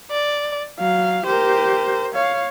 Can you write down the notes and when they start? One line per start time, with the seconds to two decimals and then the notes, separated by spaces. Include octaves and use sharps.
0.11 D5
0.79 F#3 F5
1.26 G4 A#4 C5
2.14 C#5 F5